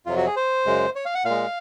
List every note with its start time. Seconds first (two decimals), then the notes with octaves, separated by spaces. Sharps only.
0.06 F2 C3 F#3 F4
0.17 F#4
0.26 G#4
0.36 C5
0.66 F#2 C#3 G#3
0.96 C#5
1.05 F5
1.15 F#5
1.25 A#2 F5
1.30 G#3